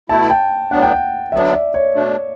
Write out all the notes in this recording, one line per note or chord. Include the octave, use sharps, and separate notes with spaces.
B2 A3 E4 A5
G5
A2 F#3 B3 D4 F#5
G5
F#5
D3 F#3 B3 D4 E5
D5
C#5
B2 A3 D4